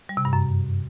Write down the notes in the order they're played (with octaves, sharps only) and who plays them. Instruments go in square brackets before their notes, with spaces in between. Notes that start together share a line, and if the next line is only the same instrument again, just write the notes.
[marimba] G3
C3
G2
F#2